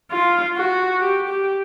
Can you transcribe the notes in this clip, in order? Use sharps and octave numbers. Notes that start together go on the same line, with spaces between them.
F4
F#4
G4
G4